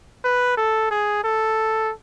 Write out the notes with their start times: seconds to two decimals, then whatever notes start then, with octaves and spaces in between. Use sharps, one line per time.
0.24 B4
0.57 A4
0.91 G#4
1.24 A4